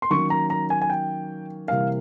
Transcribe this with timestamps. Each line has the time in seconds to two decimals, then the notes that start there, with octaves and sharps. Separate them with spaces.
0.02 C6
0.10 D#3 F#3 A#3 C#4 C#6
0.30 A#5
0.50 A#5
0.70 G#5
0.82 G#5
0.90 G5
1.67 C3 E3 G3 A#3 F5